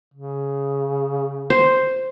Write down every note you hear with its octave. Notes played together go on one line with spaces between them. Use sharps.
C#3
C5